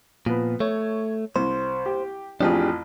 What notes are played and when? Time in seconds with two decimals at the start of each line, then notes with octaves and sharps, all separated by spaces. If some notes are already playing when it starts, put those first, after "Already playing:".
0.26 A#2 F3 B3
0.60 A3 C#5
1.36 C2 C5
1.86 G4
2.41 A1 F2 F3 D4 G4 G#4